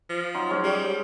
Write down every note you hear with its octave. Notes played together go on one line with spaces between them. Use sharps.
F3
F#3 D#4 C6
F#3 G#3 C#4
G3